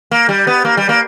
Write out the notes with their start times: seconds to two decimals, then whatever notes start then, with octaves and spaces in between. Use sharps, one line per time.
0.11 A#3
0.29 G3
0.47 B3
0.65 A#3
0.77 G3
0.89 A#3